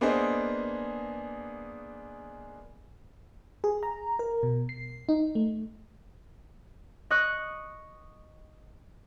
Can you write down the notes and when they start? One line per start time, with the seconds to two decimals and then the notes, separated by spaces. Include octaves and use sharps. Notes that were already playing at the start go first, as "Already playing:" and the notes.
0.01 A#3 B3 D4 G#4 C5 D#5
3.64 G#4
3.83 A#5
4.19 A#4
4.43 B2
4.69 C7
5.09 D#4
5.35 A3
7.11 D#5 C#6 F#6